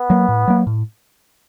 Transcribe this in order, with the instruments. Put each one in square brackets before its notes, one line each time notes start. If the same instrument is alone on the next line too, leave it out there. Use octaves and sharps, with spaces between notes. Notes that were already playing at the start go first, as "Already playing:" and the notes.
Already playing: [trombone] B3
[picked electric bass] F#3 A#3
A2
F#3 A#3
A2